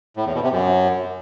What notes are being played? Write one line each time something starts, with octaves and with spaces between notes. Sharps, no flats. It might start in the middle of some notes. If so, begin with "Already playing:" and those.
A2
E2
B2
C3
F#2